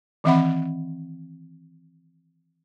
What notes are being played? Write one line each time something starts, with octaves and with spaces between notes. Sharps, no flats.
D#3 E3 C4 E5 F#5 B5